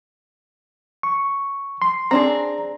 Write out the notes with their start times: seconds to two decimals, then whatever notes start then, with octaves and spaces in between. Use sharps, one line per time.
1.03 C#6
1.82 C6
2.11 C4 D4 G#4 A#5